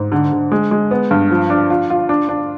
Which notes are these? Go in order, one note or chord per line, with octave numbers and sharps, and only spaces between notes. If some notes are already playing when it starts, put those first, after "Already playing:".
Already playing: G#2
D3
D3
G#3
G#3
B3
G2
F3
D4
F4
F4
D4
D4